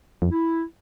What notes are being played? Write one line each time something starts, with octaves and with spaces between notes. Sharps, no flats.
F2
E4